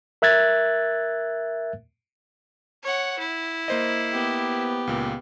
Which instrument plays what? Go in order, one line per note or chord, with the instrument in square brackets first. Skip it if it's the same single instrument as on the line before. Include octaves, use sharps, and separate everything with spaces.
[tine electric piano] A#4 E5 F#6 G#6 A6
[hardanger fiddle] C#5 F#5
E4
[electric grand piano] A#3 C5 D#5
[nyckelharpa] B3 G4
[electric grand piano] C#2 A#2